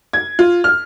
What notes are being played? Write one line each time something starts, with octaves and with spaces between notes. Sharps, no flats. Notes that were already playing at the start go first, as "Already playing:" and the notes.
G#6
F4
F6